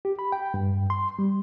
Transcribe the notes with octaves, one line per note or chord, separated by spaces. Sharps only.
G4
B5
G5
G2
C6
G3